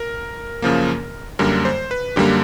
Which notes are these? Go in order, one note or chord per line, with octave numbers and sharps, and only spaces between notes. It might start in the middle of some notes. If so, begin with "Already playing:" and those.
Already playing: A#4
F#2 C#3 F3 A#3
F#2 D3 G3 A#3 A#4
C5
B4
F#2 D3 G3 A#3 G4